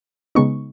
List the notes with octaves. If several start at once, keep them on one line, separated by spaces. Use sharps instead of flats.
C#3 G#3 B3 D#4 C#6